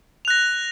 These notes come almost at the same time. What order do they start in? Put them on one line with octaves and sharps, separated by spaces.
F7 F#6 A#6